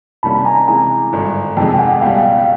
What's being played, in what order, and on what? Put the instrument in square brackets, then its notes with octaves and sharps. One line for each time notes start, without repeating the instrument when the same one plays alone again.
[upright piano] C3 D#3 G3 A#3 C#4 [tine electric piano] A5 B5
[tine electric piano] G#5 A#5
[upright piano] C3 E3 G#3 [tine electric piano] G#5 A#5
[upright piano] G#1 G2 D3
[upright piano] F2 C3 D#3 G#3 [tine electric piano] G5 A5
[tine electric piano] G5
F#5 G#5
[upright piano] C#2 B2 G3 [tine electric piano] F5 G5
[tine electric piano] F5 G5
F5